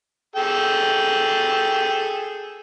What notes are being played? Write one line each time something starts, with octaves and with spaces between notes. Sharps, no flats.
G#4 A4 G5